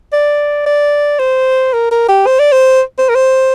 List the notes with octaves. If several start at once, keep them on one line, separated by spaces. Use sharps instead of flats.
D5
D5
C5
A#4
A#4
G4
C5
D5
C5
C5
A#4
C5